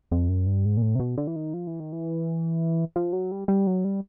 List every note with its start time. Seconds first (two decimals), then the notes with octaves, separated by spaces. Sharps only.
0.11 F2
0.29 F#2
0.46 G2
0.65 G#2
0.77 A#2
0.82 A2
0.95 C3
1.00 B2
1.18 D3
1.27 E3
1.36 D#3
1.54 F3
1.67 E3
1.80 D#3
1.93 E3
2.96 F3
3.13 F#3
3.32 G3
3.48 G3
3.67 F#3
3.85 G3